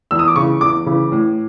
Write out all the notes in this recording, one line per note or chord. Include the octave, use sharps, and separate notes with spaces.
E2 E6
D#6
D6
C#3 E3 C#6
E2 D6
C#3 E3
A2